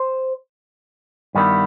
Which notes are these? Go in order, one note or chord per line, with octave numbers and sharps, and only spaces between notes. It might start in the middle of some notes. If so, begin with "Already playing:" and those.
Already playing: C5
G2 D#3 G3 B3 E4